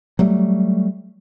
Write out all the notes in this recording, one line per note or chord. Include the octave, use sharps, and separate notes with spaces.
F#3 G3 A3